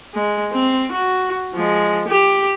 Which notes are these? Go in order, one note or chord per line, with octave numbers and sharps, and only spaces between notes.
G#3
C4
F#4
F3 G#3
G4